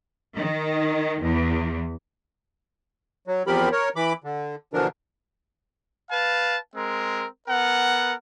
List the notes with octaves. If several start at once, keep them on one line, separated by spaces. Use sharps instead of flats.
D#3
E2
F#3
E2 F3 C4 G4 A#4 B5
A#4 C#5
E3 B5 D6
D3
B2 D3 E3 F3 D4 A#4
B4 F5 A5
G#3 C4 A#4
B3 A#4 F#5